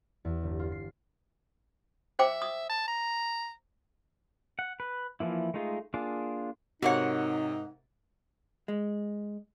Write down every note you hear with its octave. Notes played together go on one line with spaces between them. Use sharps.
E2
G1
F4
C7
C5 E5 G5 D6
D#6
A5
A#5
F#5
B4
E3 F3 A#3 E4
G#3 A3 D#4 F4 G#4
A#3 D4 F4 G#4
G#2 C3 D#4 F#4 A#4 C#5 F#5
G#3